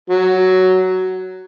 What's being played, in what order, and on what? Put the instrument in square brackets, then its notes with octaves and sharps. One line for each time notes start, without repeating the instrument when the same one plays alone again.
[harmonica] F#3